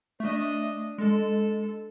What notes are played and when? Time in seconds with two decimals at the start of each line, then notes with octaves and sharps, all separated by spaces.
0.20 A3 D4 D#5
0.98 G#3 A4